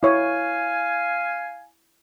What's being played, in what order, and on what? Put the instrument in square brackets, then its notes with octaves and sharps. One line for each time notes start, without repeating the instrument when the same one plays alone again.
[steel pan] E4 C#5 [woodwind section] F5 G#5